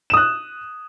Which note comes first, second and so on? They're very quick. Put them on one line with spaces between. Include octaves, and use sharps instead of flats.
E7 D#6 F#6